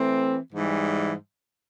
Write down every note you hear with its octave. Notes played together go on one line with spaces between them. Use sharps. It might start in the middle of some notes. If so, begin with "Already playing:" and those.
Already playing: E3 A3 C4
G#2 E3 G3